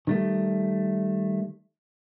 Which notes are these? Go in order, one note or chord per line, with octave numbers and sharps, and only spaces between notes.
D#3 G3 A3